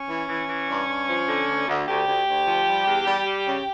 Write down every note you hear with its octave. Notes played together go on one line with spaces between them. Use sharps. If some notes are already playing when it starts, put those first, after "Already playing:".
Already playing: C#4
E3
E3
E3
G2
G2
F3
D3
D2
D2
D2 G4
D2
D2
F3
G3
E2
G3
G3
C#3